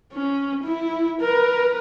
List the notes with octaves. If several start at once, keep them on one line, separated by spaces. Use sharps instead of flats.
C#4
E4
A#4 B4